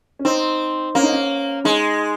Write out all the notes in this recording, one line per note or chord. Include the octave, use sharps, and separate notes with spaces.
C#4
C4 D#4
A#3 C#4
D#4
C#4
G#3 D#4